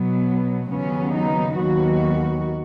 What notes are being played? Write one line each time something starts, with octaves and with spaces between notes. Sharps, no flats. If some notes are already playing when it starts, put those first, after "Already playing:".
Already playing: B2 F#3 B3
D#2 C#3 F#3 B3 C#4
D#4
D#2 D#3 F#3 B3 F#4